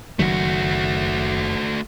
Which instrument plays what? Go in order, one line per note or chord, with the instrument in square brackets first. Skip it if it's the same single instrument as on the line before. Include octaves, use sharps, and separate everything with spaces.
[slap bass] F#1 D#3 F#3 [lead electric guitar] A3 F#4